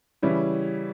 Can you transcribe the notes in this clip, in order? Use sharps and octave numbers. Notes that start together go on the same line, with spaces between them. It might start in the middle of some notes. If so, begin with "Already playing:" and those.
C#3 E3 G3 C#4 E4